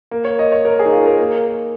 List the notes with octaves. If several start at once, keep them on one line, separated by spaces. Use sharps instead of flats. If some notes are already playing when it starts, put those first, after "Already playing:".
A#3
C#5
D#5
C#5
A#4
G#4
D#4
F4
A#4
A#3